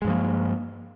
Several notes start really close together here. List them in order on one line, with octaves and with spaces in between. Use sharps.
G#3 G2 F3 A#3